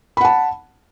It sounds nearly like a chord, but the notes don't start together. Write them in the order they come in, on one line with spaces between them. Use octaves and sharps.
B5 F#5 A5